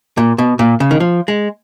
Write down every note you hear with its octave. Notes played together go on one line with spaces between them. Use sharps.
A#2
B2
A#2
C#3
D#3
F3
G#3